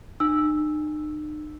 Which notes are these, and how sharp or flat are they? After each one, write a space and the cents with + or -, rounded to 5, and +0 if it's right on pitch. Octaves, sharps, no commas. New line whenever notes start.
D#4 -40 E6 +0